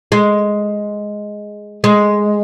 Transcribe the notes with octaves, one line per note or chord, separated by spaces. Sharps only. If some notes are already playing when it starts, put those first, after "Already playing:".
G#3
G#3